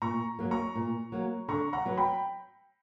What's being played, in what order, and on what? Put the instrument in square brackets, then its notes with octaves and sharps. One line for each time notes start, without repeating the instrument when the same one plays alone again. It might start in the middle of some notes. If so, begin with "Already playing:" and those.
[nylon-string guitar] A#2 [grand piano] A#5 C#6
[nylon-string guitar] F#3 A#3
[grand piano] A#5 C#6
[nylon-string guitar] A#2
F#3 A#3
[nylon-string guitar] D3 [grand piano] A#5 C#6
[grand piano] F#5 A#5
[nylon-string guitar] F#3 B3
[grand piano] G5 B5